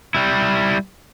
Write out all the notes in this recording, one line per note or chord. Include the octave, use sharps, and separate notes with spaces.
G3 E4